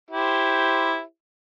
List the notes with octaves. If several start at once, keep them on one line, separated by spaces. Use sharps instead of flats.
E4 G4 C5